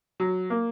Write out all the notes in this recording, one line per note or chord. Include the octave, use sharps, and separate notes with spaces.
F#3
A#3